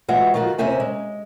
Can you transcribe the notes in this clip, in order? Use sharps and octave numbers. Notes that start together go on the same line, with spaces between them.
E3 G#3 F4 F#4 E5 F#5
D#3 F3 F4 F#4
D#2 C3 C#4 C5 E5 G#5
G#3